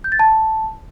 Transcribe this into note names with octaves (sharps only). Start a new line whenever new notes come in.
G6
A6
A5